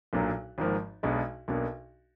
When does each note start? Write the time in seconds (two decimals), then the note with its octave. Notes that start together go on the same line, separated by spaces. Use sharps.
0.13 B1 A#2 F#3 D4
0.58 G#1 G#2 F3 A#3
1.03 B1 B2 G#3 D4
1.48 B1 B2 A#3 D4